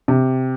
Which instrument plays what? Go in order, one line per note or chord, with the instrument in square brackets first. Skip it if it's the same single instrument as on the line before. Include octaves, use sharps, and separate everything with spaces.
[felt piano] C3